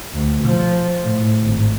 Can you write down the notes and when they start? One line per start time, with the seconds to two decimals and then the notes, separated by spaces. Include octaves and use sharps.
0.14 D2
0.43 F3
1.02 A2
1.42 G#1